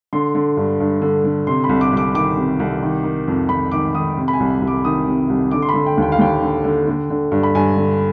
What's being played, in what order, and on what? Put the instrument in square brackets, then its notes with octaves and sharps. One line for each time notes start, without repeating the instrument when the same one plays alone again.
[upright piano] D3 C6
D3
G2
G2
D3
D3
C3 C6
B5
C2
D6
C2 D6
D#3 D6
C3
C2
D#3
D#3
F2
F2 B5
D#3 D6
D#3 D#6
C3
B5
G#5
C2
C2
D6
D#3 D#6
C3
C2
D3 D6
C6
B5
D3
G5
D#2 G5
F5
D#2 G5
D3
D3
D3
D3
G2
B5
G2 G#5
D3